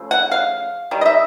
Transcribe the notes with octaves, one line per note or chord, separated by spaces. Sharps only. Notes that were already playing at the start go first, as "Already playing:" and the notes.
Already playing: C#3 F3 A3
F#5
F5
D#3 G3
D#5
E5